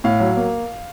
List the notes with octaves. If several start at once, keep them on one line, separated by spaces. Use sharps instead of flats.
A2 F5
F#3
A#3